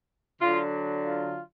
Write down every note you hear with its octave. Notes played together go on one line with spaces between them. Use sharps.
D3 F#3 D4 F4
F4